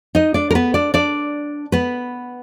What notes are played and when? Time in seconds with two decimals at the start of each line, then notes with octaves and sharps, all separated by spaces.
0.15 D#4 D#5
0.34 D4 D5
0.50 A#4
0.55 B3 B4
0.74 D4 D5
0.94 D4 D5
1.72 B3 B4